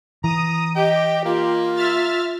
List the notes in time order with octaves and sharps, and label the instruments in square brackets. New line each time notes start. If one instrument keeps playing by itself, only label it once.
[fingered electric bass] E3 [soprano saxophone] A#5 [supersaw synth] D#6
[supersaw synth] G4 [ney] D#5 [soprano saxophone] G5
[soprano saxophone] A#3 [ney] F4
[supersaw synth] E5 F6 A6